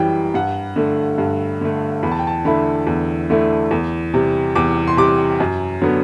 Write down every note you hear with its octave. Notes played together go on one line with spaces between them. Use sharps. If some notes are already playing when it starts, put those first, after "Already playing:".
Already playing: F#2 E3 G3 G5
G2 F#5
D3 A3
G2
D3 A3
E2 B5
A5
G5
A5
D3 A3 E4 B5
E2
D3 A3 E4
E2
C3 G3
E2 D6
C6
C3 G3 D6
F#2
D3 F#3 B3